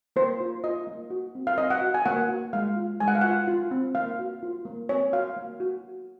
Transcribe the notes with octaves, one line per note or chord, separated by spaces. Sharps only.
A#3 C5
F4
F4 D#5
A#3
F#4
C4
F5
C4 D#5
F#5
F#4
G#5
A#3 F#5
F#4
G#3 F5
F4
G#3 G#5
F#5
F5
F4 F#5
F4
C4
A#3 F5
F#4
F4
A#3
C4 C#5
F#4 F5
A#3
F#4